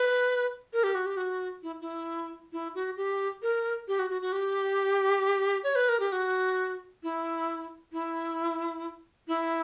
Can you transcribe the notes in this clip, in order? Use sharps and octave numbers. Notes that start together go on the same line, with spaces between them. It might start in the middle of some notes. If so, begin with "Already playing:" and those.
Already playing: B4
A#4
G4
F#4
G4
F#4
E4
E4
E4
F#4
G4
A#4
G4
F#4
F#4
F#4
G4
C#5
B4
A#4
G4
F#4
E4
E4
E4